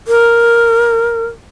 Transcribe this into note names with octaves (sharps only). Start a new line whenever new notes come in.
A#4